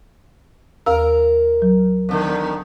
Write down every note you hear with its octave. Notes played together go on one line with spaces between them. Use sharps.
D#2 A#4 F5 E6
F#3
E2 D3 D#3